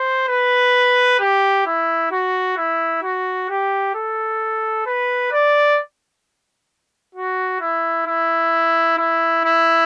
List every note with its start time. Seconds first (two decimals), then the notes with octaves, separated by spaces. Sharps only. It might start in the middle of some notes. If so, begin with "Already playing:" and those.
Already playing: C5
0.28 B4
1.19 G4
1.66 E4
2.11 F#4
2.57 E4
3.03 F#4
3.49 G4
3.95 A4
4.86 B4
5.32 D5
7.15 F#4
7.61 E4
8.06 E4
8.98 E4
9.45 E4